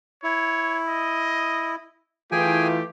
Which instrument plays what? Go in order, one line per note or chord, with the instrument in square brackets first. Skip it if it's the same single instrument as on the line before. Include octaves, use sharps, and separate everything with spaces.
[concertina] E4 [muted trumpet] C#5
[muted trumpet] D#5
[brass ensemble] E3 A3 F4 [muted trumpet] G4 [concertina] G#4 G5 G#5